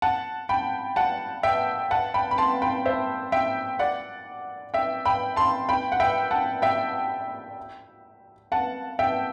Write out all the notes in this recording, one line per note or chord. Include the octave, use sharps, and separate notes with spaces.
F#5 A5
G5 B5
F#5 A5
E5 G5
F#5 A5
G5 B5
B5
A5 C6
G5 B5
C5 E5
E5 G5
D5 F#5
E5 G5
G5 B5
A5 C6
G5 B5
F#5
E5 G5
F#5 A5
E5 G5
F#5 A5
E5 G5